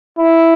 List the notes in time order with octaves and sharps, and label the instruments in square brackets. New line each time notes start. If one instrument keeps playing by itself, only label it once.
[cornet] E4